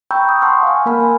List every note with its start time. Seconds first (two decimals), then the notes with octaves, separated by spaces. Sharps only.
0.11 G5 A#5 B5 C#6 E6 G6
0.29 D#6
0.41 F#5 A5 C6 C#6 E6 F6
0.63 F5 G#5
0.86 A#3 A#4 B5 F6
1.00 G#5